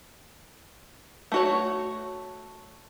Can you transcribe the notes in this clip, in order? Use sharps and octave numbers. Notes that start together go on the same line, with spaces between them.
A3 F#4 C#5